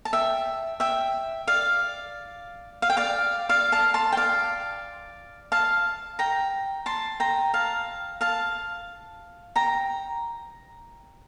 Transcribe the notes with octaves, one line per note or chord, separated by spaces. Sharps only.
A5
E5 G5
E5 G5
D5 F5
F5
G5
D5 F5
D5 F5
F5 A5
A5 C6
G5
D5 F5
F5 A5
G5 A#5
A5 C6
G5 A#5
F5 A5
F5 A5
G5 A#5